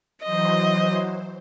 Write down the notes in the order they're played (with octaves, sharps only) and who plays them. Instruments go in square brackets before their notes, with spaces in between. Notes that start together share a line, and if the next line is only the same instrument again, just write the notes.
[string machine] E3 F#3 C5 [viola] D#5